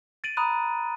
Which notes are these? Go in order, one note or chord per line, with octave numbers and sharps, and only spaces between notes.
A6 D7 D#7 F#7
A#5 B5 D#6 F#6 D#7